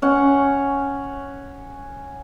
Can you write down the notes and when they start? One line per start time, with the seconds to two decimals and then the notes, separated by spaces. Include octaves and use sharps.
0.02 C#4 F#5